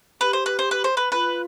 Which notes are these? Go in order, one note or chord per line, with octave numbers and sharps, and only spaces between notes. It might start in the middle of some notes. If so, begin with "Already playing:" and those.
G4 B4
C5
B4
C5
B4
C5
B4
F4 B4